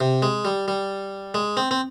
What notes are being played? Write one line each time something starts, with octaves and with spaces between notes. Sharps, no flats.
C3
G#3
G3
G3
G#3
C4
C4